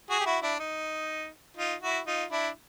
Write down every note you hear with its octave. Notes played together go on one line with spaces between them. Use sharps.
F#4 G#4
G4
E4 F#4
D4 E4
D#4
D#4 F4
E4 F#4
D#4 F4
D4 E4